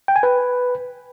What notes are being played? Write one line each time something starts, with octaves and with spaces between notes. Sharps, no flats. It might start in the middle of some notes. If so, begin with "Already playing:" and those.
G5
G#5
B4